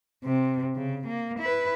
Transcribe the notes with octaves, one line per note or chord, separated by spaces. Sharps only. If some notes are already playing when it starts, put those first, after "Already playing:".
C3
C#3
A#3
E4 B4